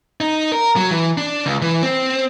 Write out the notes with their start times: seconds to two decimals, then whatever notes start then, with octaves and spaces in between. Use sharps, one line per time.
0.20 D#4
0.52 A#4
0.76 F#3
0.91 E3
1.18 D4
1.46 C#2
1.62 E3
1.83 C4